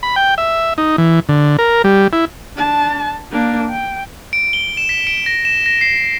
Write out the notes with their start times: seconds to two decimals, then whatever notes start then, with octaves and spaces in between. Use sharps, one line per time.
0.03 B5
0.16 G5
0.38 E5
0.78 D#4
0.98 E3
1.29 D3
1.59 A#4
1.84 G3
2.13 E4
2.56 D4 A5
3.32 A#3 D4
3.69 G5
4.33 D7
4.53 G7
4.77 E7
4.89 B6
5.07 D7
5.26 A#6
5.45 E7
5.66 A#6
5.81 C7